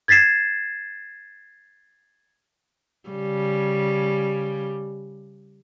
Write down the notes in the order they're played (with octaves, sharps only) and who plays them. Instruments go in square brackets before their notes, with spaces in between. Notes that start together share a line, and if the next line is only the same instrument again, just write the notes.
[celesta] G#6 A6 B6 C7 E7
[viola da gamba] C#3 G3